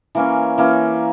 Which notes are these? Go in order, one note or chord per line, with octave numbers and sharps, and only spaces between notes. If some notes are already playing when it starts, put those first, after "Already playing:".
E3 A#3 C#4
E3 A#3 C#4